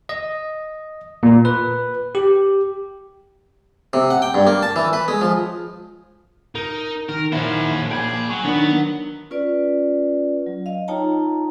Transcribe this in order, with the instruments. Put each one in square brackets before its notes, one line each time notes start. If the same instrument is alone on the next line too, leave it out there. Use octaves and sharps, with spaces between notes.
[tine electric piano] D#5
A#2
B4
G4
[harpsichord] C3
F#5
G5
G2
A#3
A5
E3
B4
G#3
F3
[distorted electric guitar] D#4 [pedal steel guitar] A#4
[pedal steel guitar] D#3 [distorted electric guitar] A#4
[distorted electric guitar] A#2 C5 [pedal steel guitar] D#3 E4 [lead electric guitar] C#4 F#4
[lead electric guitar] G#4 [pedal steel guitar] G5 B5 D6
[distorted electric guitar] F#3 [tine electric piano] C#6
[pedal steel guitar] D#3 [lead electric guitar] B3 [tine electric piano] D4
[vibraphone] C#4 F4 B4 D5
F#3
D#5 F5
D#4 F4 C#5 G5 A5 A#5